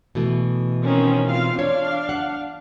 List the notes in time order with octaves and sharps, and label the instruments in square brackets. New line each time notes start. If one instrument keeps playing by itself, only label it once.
[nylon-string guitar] B2 E3 A3
[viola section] D#3 C4 C#4
C4 F4 F5
[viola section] D4 F5 [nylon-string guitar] C#5
[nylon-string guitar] F#5